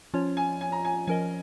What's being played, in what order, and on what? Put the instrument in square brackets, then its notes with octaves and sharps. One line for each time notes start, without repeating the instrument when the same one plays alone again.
[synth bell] F3 C#4 F4 C#5
[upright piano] G#5
G#5
A#5
G#5
[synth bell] F3 C#4 A#4 D#5 [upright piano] G#5